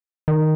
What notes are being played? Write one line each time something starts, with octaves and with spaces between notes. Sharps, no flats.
D#3